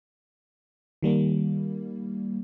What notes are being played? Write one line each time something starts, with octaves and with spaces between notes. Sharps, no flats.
D#3 G3 A#3